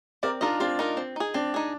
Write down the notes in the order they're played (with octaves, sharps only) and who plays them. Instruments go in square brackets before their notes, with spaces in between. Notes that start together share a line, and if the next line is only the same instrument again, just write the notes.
[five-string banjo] C4 [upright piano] A#4 D5
[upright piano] D4 F4 [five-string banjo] D#4 A#4 D#5
[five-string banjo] C4 [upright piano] D4 F4
[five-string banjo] D#4 A#4 D#5
C4
D#4 G#4
[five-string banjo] C4 [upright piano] D4
[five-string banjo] D#4 G#4